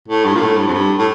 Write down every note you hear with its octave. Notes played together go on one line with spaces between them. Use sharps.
A2
G2
A#2
A2
G2
F2
G2
A2